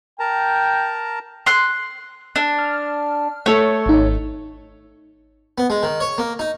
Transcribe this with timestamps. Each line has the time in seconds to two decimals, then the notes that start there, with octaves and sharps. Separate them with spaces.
0.19 A#4 G5 A5 A#5
1.46 C6 F#6
2.36 D4
2.59 F6
3.46 A3 A4 C#5
3.86 G#1 D#4
5.58 B3
5.70 G#3
5.83 D#3
6.00 C#5
6.18 A#3
6.39 D#4